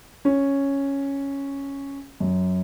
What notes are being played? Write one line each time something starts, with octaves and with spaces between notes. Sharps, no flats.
C#4
F#2